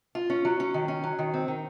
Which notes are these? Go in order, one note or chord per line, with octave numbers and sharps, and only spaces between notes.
F4
C#4
F#3
C#4
D#3
C#4
F#3
D#3
C4
D#3